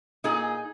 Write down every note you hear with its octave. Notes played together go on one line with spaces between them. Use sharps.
A#2 D#4 G#4